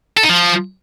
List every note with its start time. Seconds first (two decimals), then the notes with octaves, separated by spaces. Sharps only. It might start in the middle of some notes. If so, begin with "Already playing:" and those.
0.17 A4
0.23 D#4
0.29 F3